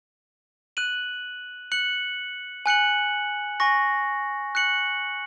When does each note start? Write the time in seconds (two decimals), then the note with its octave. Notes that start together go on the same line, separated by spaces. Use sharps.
0.77 F#6 D#7 F#7
1.72 F#6 C#7 F#7
2.66 G#5 F#6 C#7 F#7
3.60 G#5 C#6 A#6
4.55 F#6 C#7 F#7